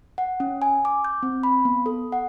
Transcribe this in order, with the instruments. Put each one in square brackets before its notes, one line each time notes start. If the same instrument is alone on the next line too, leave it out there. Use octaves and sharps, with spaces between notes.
[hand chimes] F#5
C#4
G#5
D6
G6
C4
B5
B3
A4
F#5